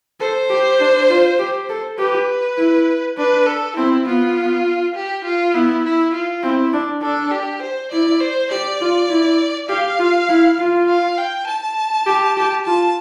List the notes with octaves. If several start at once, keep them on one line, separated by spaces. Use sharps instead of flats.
A4 C5
G4
D4
F4
G4
A4
G4 B4
E4
D4 B4
A4
C4 E4
B3 F4
G4
F4
B3 E4
E4
F4
C4 E4
D4
D4 A4
G4
C5
E4 D5
C5
G4 D5
F4
E4
G4 F5
F4
E4
F4
F5
G5
A5
G4
G4
F4 A5